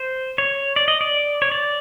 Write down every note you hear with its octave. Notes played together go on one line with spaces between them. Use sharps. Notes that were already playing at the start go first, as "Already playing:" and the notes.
Already playing: C5
C#5
D5
D#5
D5
C#5
D5